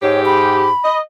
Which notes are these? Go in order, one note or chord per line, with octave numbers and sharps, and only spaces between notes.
G#2 G4 C#5
B5
D#5